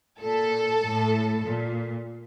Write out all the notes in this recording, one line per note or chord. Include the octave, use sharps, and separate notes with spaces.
A#2 A4
A2
A#2